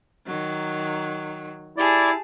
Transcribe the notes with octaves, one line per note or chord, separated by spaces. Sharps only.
D#3 F#3
E4 G4 G#4 D5 A5